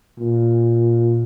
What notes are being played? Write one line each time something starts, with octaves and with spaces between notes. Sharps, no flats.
A#2